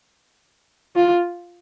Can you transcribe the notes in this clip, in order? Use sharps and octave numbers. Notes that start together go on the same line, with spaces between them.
F4